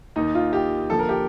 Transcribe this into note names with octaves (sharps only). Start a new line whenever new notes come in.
D#2 D#3 D#4
F4
G4
D#2 D3 F3 A4
A#4
G4